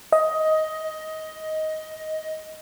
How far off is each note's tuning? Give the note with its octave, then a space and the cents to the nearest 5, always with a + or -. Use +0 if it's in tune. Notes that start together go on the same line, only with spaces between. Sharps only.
D#5 +15